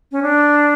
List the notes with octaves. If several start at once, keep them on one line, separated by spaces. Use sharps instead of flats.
C#4
D4